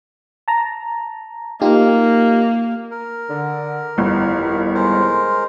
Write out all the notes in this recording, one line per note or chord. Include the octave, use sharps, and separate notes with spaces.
A5 A#5
A#3 D#4 F4 G4
A#4
D3
G1 F2 D#3 E4
G#3 A#4 C5